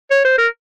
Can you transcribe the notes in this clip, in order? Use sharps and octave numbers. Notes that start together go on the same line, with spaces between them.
C#5
C5
A#4